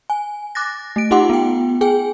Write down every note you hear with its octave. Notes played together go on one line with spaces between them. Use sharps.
G#5
D6 F#6 A6 A#6
A3 D7
D#4 F4 G4 F#5 C6 D6
B3 G5
G#4 G5 G#5